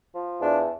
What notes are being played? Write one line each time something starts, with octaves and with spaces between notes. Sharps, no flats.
F3
E2 D4